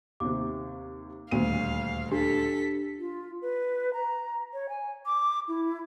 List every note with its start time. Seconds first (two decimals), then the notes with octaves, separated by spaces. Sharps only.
0.20 D#2 C3 D6
1.31 D#1 D2 F5 D#7
2.12 D4 G4 A4 B6
2.99 F4
3.42 B4
3.94 A#5
4.53 C#5
4.69 G#5
5.06 D6
5.48 E4